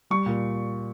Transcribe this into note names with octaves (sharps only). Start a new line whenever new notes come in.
G3 C#6
A#2